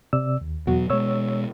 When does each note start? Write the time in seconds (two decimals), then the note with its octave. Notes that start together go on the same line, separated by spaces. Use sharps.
0.13 C3 D5 E6
0.41 D#2
0.67 E2 B2 F#3 F#4
0.90 B2 G#3 C#5 E6